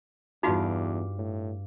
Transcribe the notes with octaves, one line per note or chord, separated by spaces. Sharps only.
E2 G2 D#4 F4 F#4 F5 D6
A2